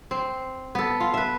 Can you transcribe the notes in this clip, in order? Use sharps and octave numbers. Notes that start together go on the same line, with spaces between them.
C4
B3 A4
F4
B4 E5